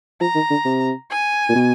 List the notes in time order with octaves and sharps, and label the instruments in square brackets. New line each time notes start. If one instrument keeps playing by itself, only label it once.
[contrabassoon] F3 [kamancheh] A#5
[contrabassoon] D#3
D3
C3
[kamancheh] G#5
[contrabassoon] A#2
B2